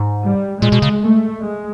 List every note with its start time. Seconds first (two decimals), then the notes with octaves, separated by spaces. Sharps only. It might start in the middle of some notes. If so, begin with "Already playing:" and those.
Already playing: G#2
0.22 G3
0.62 A#2 G#3
0.72 B2
0.82 C#3
1.02 A3
1.43 G#3